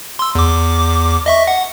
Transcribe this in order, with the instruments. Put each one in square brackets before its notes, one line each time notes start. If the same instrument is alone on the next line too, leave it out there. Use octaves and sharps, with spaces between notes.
[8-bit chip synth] C6 E6
E2 D6
D#5 E5 C#6
F#5